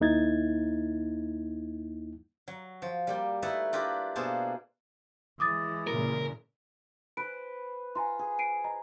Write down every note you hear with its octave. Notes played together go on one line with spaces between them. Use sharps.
D#2 A#3 D#4 E4 G#6 A6
F#3
F3
G3 A#3 G5
A3 D#4 E4 A4 B4
D4 E4 F4 G4 A#4 B4
B2 A#3 D4 G#4 C5 A5
E3 G#3 D6 D#6 A6
A#2 C#3 A#4
B4 C5 D7
F4 G#5 A#5 C6
G#4
C7 D7 D#7
D#5 A#5